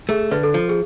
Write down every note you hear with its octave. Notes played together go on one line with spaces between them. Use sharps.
A3 G#4
D3 B4
A4
F3
G#4